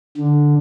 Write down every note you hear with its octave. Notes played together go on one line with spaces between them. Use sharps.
D3